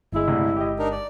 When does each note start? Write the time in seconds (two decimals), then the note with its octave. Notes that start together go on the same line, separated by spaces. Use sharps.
0.13 G1 G#3 E4
0.28 C2 A2
0.56 G4 D#5
0.79 D4 D#4 A#4
0.91 D5